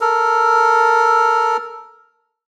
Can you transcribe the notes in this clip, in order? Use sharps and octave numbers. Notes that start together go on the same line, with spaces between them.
A4 A#4